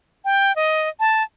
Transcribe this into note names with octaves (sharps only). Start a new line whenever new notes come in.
G5
D#5
A5